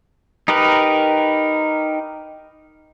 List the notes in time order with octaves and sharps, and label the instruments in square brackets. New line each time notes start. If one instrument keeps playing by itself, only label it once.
[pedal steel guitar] D#4 G4 A#4 B4